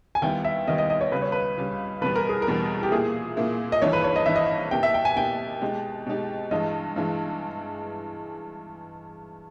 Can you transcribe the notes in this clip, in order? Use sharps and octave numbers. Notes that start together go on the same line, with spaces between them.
G#5
D#2 D#3 G3 B3 E4 G5
E5
D#2 D#3 G3 B3 E4 D#5
D#5
D#5
C#5
C#2 C#3 G3 B4
C#5
B4
C#2 C#3 G3
E2 B2 G3 B4
A#4
G#4
A#4
E2 B2 G3
G4
A#2 A#3 E4 G#4
A#2 A#3 E4
D#5
G#1 G2 E3 C#5
B4
C#5
D#5
G#1 G2 E3 E5
D#5
B2 A#3 E4 G4 G5
E5
G5
G#5
B2 A#3 E4 G4 G5
B2 G#3 D#4 G4
B2 G#3 D#4 G4
G2 E3 G#3 D#5
G2 E3 G#3